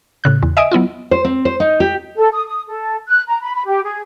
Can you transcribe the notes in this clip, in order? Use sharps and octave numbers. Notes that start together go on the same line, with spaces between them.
A2 C#3 F#6
E2
D#5 E5 G#5 D#6 D7
F#3 B3 E4 F4
C5
C4
C5
D#4
G4
A4
D#6
D#6
A4
F#6
A#5
B5
B5
G4
G#4